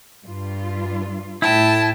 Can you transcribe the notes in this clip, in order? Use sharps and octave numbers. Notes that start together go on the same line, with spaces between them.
G2 F4
A2 E4 G5 A5